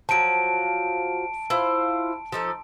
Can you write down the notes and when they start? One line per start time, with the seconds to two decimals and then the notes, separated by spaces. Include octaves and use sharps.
0.09 F3 F#3 A5 D7
1.50 E4 F4 C5
2.32 F3 D#4 A4